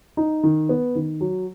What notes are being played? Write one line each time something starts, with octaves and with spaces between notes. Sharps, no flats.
D#4
D#3
B3
D#3
F#3